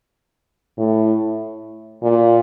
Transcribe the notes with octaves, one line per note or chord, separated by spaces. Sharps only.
A2
A#2